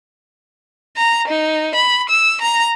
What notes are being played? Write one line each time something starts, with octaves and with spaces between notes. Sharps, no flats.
A#5
D#4
B5
E6
A#5